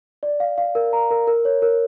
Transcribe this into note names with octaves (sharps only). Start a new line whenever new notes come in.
D5
F5
F5
A#4
A#5
A#4
A#4
C#5
A#4